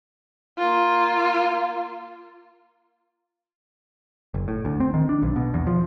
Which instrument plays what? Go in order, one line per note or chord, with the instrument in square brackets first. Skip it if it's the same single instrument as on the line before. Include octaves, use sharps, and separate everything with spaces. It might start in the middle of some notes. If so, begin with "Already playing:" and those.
[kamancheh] A#3 F4
[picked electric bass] F#1
A2
D2
C4
D#3
D4
B1
B2
E2
F3